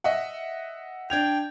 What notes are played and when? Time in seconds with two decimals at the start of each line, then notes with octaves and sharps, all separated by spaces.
0.04 D#5 E5 F#5
1.10 D4 G5 G#6 F7